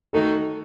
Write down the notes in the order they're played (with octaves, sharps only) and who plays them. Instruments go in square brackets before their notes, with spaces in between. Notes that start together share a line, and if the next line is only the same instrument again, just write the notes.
[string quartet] D#3 A3 D#4 F#4 [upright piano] A4